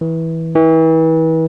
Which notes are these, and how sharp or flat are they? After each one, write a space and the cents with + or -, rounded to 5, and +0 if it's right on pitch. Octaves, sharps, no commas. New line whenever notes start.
E3 -15
E3 -35